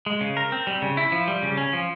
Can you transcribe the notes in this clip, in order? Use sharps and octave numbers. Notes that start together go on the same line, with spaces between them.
G#3
C#3
A#4
C4
G3
C#3
E4
F3
G3
C#3
C#4
F3